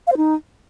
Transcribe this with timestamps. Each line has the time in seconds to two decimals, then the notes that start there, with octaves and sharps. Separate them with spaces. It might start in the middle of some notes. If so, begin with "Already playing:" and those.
0.07 F5
0.12 C5
0.17 D#4